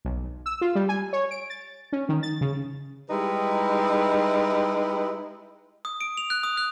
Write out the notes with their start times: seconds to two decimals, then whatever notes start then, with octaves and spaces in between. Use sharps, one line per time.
0.05 B1
0.46 E6
0.61 F4
0.75 G3
0.89 G#5
1.13 C#5
1.31 D7
1.50 A6
1.93 C#4
2.09 D#3
2.23 A6
2.41 C#3
3.10 G3 G#3 D#4 E4 G4 B4
5.85 D#6
6.01 D7
6.17 F7
6.30 F#6
6.43 D#6
6.57 F#6